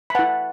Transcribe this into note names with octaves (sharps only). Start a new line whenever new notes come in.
B5
E4 B4 F#5 A5